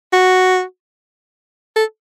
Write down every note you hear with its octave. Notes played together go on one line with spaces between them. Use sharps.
F#4
A4